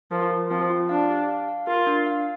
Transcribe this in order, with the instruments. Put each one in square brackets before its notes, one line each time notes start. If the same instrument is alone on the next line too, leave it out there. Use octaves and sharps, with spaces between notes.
[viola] F3 [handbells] A#4
[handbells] F4
[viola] F3 [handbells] C4
[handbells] F4
[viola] D4 [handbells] F5
[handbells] G4
F5
F5
[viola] F4 [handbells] A#4
[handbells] D4
F5